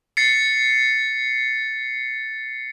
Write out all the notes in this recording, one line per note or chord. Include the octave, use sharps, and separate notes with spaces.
A6 C7 C#7